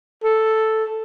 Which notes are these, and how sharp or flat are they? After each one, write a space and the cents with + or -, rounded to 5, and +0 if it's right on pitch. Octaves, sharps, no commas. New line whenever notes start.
A4 +0